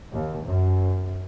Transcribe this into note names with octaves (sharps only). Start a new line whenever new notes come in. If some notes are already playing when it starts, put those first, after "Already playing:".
D#2
F#2